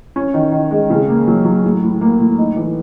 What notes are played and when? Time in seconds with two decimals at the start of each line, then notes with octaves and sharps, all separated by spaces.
0.16 C#4
0.34 D#3
0.52 D#3
0.71 G#3
0.90 C#3
1.08 A#3
1.27 F#3
1.45 F#3
1.64 A2
1.83 A2
2.01 A#3
2.19 A2
2.38 D#4
2.56 E3